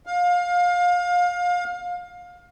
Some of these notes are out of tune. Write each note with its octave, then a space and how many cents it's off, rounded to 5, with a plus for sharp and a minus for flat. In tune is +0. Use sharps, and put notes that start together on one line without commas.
F5 +25